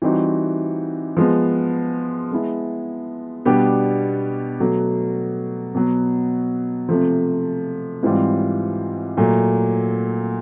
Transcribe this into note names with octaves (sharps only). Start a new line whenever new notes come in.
E3 G3 C4 D#4 F#4
F3 G#3 B3
G#3 B3 E4
B2 G3 B3 D4 G4
B2 F#3 A3
B2 F#3 B3
C3 F3 A3
G#2 E3 G3 C4 F4
A#2 F#3 A3